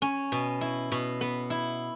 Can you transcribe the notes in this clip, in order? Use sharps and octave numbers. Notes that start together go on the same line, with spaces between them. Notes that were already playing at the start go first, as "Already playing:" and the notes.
C#4
B2
E4
B2
B3
E4